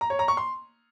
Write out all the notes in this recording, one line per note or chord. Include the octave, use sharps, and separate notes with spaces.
A#5
C#5
A#5
C#6
C6